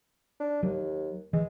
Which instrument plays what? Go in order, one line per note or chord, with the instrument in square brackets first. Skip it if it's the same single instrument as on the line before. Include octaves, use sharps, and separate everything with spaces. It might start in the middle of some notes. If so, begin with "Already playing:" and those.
[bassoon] D4
[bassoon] D#2 [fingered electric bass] F#3
[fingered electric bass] E3 [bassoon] G#3